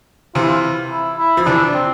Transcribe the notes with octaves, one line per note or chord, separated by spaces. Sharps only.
C3 E3 F4
E4
F4
E4
E4
F3 E4
C3 E3 D4
C4